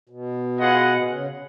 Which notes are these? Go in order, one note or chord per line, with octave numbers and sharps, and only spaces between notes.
B2
B3 F4 G#4 D#5 F#5
A#2
B2
C#3